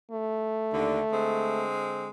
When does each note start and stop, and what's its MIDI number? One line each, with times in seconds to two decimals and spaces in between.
0.11 1.64 57
0.74 1.01 39
0.74 1.01 50
1.13 2.08 50
1.13 2.08 56
1.13 2.08 60